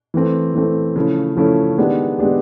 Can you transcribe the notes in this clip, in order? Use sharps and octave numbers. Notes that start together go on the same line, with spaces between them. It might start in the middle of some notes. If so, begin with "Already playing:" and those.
E3 A3 C4
E3 A3 C4
C#3 F3 A3 C#4 E4
C#3 F3 A3 C#4 E4
D#3 G#3 B3 D4 G4
D#3 G#3 B3 D4 G4